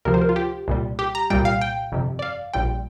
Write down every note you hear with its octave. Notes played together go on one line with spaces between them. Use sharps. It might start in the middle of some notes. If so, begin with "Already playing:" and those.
D2 C3 F3 A#4
C5
A#4
F4
G4
C2 A#2 G3
G4
A#5
C2 A#2 G3 G5
F5
G5
G1 F2 C3
D5
F5
A#1 A#2 G3 G5